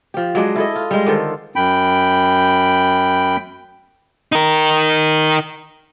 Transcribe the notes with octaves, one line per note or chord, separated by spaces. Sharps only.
F3 G4
F#3 G#3 D4 G#4
E4 A4 D#5
F4
G3 G#3
D3 D#3 A4 C5
F#2 G5 B5
D#4 A#4